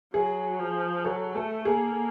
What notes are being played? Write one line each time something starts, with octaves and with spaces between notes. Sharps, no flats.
F#3 G#4
F3
F#3 A4
A3 A4
A#3 G#4